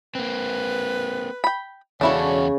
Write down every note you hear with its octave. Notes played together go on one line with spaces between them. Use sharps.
A#3 C4 B4
G5 B5
E2 C#3 D4 E4 F#4 A4 C#5